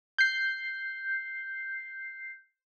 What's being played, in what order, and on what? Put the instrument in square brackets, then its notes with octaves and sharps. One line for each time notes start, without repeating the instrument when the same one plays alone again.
[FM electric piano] G6 C7